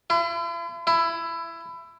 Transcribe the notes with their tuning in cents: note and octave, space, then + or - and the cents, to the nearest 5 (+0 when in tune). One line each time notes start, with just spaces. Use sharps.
E4 +45
E4 +20